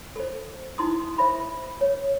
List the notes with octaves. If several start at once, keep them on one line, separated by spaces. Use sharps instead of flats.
A4 C5
D#4 E4 C6 D#6
C5 E5 B5
C#5